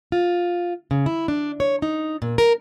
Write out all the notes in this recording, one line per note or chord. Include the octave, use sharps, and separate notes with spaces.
F4
C#3
E4
D4
C#5
D#4
A#2
A#4